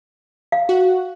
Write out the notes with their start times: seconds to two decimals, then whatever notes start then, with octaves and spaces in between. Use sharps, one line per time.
0.52 F5
0.69 F#4